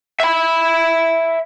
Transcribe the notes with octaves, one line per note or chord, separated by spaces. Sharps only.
E5 B5